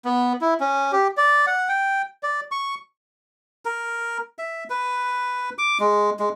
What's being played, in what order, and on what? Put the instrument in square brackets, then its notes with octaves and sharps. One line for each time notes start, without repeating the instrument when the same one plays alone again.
[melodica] B3
E4
C#4
G4
D5
F#5
G5
D5
C#6
A#4
E5
B4
D6
G#3
G#3